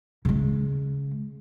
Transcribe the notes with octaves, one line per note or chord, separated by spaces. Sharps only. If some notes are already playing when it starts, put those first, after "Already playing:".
C#3 G#3